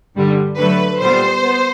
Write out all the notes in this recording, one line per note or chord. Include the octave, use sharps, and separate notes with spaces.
G2 D3 G3
D3 F#3 A3 B4
A#2 G3 B3 C5
B3